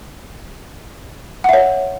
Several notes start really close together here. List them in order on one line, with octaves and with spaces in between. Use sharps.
F#5 E5 C#5